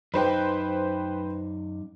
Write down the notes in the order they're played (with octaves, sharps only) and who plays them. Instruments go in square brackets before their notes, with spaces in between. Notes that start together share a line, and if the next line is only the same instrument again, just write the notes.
[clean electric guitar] F#2 D#4 G4 [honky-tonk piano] B4 C5 G5